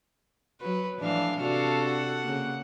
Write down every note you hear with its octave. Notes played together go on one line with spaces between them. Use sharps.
F#3 B4
A2 E3 F3 D4 F5
C3 D4 F#4 A4 F5
F#5
C#3 A#3